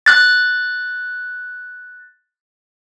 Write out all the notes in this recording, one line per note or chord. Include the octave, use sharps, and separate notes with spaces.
F#6 A6